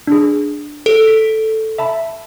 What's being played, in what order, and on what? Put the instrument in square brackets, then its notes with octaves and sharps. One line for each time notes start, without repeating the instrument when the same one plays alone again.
[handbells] D4 G#4
[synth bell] A4
[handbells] B6
E5 A5 B5